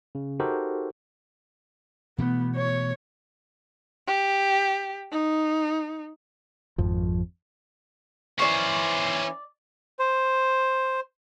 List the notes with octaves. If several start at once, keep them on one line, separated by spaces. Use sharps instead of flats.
C#3
D#4 F#4 G4 A4 A#4 C5
B2 E3 A3 B3
C#5
G4
D#4
G#1 F2 F3
E3 C#4 C5 D5 C#6
C5